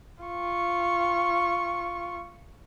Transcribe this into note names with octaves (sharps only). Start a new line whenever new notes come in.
F4 C#6